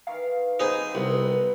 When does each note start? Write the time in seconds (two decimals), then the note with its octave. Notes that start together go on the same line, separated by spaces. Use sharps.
0.07 D#3 E3 F5
0.60 F#3 C4 D#4 G#4 B4 C5
0.95 C2 B2 F#5
1.13 B4